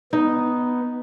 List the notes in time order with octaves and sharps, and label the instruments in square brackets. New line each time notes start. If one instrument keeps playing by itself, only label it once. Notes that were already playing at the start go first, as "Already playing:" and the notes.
[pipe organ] B3 [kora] D#4